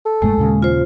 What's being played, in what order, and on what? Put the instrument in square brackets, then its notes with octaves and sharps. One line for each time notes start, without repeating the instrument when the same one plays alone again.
[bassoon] A4
[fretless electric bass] E1 G2 A3 [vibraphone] G#3
[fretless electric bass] D#2 A#2 C#3
[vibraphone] F4 C5